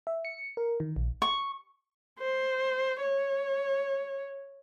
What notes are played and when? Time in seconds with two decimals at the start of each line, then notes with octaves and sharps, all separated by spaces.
0.07 E5
0.25 C#7
0.57 A#4
0.80 D#3
0.96 A#1
1.22 C#6
2.19 C5
3.02 C#5